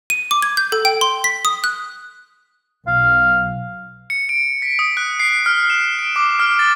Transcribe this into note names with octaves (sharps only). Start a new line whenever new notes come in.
D#7
D6
G#6
G6
A4
G5
C6
B6
D#6
F#6
B1 F5
C#7
D7
B6
D#6
F#6
C7
F6
E7
D7
D6
F6
A6